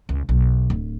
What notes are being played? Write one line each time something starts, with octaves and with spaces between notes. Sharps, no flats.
C#2
B1
D1